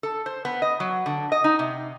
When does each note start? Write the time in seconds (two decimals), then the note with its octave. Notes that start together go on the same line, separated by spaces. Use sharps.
0.03 A4
0.26 C5
0.45 B3
0.62 D#5
0.80 F#3
1.06 D3
1.32 D#5
1.44 D#4
1.59 C3